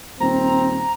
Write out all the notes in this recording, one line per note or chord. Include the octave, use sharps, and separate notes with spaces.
D#1 C4 A#5